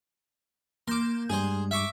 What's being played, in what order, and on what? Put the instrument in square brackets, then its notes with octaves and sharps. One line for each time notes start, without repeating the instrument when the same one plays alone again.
[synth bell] A#3 G6 E7 [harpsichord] C6 D6
[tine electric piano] G2 G3 [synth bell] G#3 [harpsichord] G#4 C5
[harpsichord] E5 C#6 D6